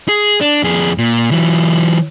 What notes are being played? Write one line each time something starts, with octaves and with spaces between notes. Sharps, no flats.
G#4
D4
F2 G#4
A#2
E3 F#3